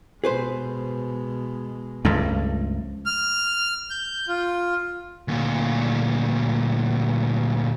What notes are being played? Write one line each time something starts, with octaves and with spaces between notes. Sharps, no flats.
B2 G#3 G#4 B4 C5
C#2 G2 F3 A3
F6
G6
F4
D2 A#2